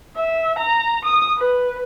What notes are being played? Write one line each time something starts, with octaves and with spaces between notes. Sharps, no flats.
E5
A#5
D#6
B4